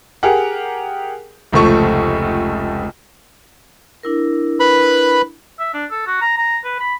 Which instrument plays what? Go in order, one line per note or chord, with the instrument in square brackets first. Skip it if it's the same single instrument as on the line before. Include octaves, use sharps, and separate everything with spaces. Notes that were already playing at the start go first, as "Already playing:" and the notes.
[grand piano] G4 G#4 A#4 F#5
F1 C#2 F3 A3 C#6
[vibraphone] D4 E4 A#4
[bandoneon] B4 B5
[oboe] E5
D4
A4
F#4
A#5
A#5
B4
B5